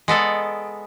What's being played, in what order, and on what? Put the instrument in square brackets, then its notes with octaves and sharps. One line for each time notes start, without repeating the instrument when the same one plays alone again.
[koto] G#3 B3 A4 D5